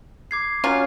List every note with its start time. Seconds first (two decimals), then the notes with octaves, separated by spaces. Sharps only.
0.31 D6 G#6 C7
0.64 F#3 C#4 F4